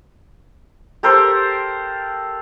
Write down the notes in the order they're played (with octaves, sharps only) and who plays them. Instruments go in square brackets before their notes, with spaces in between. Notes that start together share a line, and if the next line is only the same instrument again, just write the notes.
[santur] G4 A4 A#4 C5